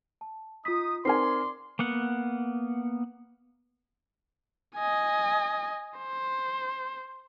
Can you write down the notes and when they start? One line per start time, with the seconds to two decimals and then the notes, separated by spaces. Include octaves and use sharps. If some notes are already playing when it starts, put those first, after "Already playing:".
0.21 A5
0.65 D#4 F4 D#6 B6
1.05 C4 D#4 A#4 D5 G#5 C6 C7
1.79 A#3 B3 F#5
4.76 D#5 G#5
5.98 C5